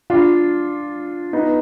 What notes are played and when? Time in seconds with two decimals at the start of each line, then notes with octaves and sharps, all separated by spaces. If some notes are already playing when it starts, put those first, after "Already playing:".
0.10 D4 F4
1.33 B3 D#4